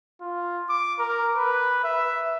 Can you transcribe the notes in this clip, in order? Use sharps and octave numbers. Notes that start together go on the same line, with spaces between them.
F4
D6
A#4
B4
E5